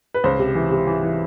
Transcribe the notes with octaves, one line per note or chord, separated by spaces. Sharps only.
B4
C#2 C5
C3
E3
C3
E3
E3